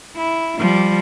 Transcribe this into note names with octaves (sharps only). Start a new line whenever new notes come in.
E4
F3 G3